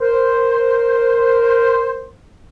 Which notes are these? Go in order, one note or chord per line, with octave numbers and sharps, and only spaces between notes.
A#4 C5